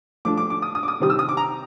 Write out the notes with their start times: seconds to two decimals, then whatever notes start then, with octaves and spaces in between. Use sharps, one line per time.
0.25 F3 A3 D4 D6
0.38 D6
0.50 D6
0.62 D#6
0.75 D#6
0.83 D6
0.88 D#6
1.00 C3 D#3 G3 C4 D#6
1.10 E6
1.19 D#6
1.29 D6
1.37 A#5